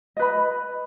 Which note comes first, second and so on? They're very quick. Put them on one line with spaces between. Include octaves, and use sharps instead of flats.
D#5 B4 B5